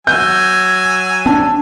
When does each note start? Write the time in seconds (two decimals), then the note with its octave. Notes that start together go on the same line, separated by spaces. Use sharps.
0.07 F#3 G#5 E6 G6
1.26 C4 D4 A5